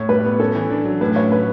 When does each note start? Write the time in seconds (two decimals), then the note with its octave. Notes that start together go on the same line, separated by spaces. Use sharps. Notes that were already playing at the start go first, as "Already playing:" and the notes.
Already playing: A2 C#5
0.09 G3 B4
0.25 B3
0.40 C#4 A4
0.55 E3
0.71 D4
0.85 F#3
1.01 A2 B4
1.16 C#4 C#5
1.31 F#3 B4